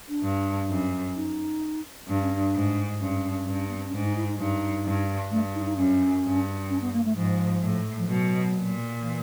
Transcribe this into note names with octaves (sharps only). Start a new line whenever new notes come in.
D4
G2
F#2
D#4
G2 D4
C#4
D4
G#2
G2 C#4
G2
B3
C4
C#4
G#2 D4
D#4
E4
D#4
G2 D#4
G2
G2 A3
D#4
D#4
F#2 C#4
G2
C#4
B3
A#3
A3
G#2 F3
A2
F3
B2 F#3
A#2
E3